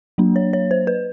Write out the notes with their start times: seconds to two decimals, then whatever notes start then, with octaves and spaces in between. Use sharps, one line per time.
0.18 F#3 A#3 D4
0.36 C#5
0.53 C#5
0.71 C5
0.87 B4